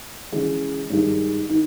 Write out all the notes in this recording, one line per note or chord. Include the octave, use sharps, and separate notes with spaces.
C#3 E3 G#3
G2 D#3 G#3
D#3